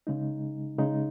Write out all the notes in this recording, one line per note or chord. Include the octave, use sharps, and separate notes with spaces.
C#3 G#3 D#4
C#3 G#3 D#4